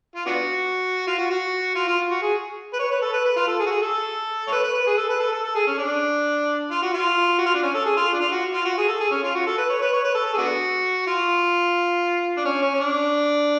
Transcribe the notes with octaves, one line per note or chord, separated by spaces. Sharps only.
F4
B3 D4 F#4
F4
F#4
F#4
F4
F4
F#4
G#4
B4
C#5
B4
A4
B4
B4
F4
A4
G#4
F#4
G#4
A4
C#5
B4
B4
B4
G#4
A4
B4
A4
A4
A4
G#4
C#4
D4
F4
F#4
F4
F#4
F4
D4
C#4
A4
G#4
F4
D4
F4
F#4
F4
F#4
G#4
A4
G#4
C#4
F4
F#4
A4
B4
C#5
B4
C#5
B4
A4
A4
G#4
B3 D4 F#4
F4
D4
C#4
C#4
C#4
D4